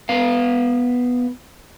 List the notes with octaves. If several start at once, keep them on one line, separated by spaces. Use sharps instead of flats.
B3 B4 F5